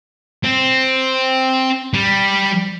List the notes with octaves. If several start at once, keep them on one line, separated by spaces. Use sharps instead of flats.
C4
G3